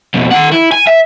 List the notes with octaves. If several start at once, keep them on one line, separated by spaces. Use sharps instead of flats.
F2 B2
D#3 F#5
E4
G#5
E5